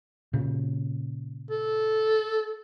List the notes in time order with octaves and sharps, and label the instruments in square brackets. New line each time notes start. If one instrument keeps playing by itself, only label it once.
[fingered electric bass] A#2 C#3
[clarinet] A4